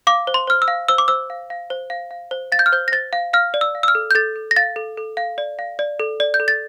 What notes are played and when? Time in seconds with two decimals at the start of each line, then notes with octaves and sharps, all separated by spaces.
0.07 F5 D6
0.27 C5
0.34 C6
0.47 C5 F6
0.62 E6
0.68 F5
0.88 C5 E6
0.98 D6
1.08 C5 E6
1.30 F5
1.50 F5
1.70 C5
1.90 F5
2.11 F5
2.31 C5
2.52 F5 A6
2.59 G6
2.66 F6
2.72 C5 G6
2.88 A#6
2.92 C5 A6
3.13 F5
3.33 F5 F6
3.54 D5
3.61 E6
3.75 F5
3.83 E6
3.88 F6
3.95 A4
4.11 G6
4.15 A4 A6
4.36 A4
4.51 A#6
4.56 F5 A6
4.76 A4
4.97 A4
5.17 F5
5.38 D5
5.59 F5
5.79 D5
6.00 A4
6.20 D5
6.34 G6
6.40 A4
6.48 A6